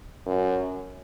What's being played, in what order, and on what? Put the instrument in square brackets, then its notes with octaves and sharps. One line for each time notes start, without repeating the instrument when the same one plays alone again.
[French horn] F#2